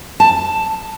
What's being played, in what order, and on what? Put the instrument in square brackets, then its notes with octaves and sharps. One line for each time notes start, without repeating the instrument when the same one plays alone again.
[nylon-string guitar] A5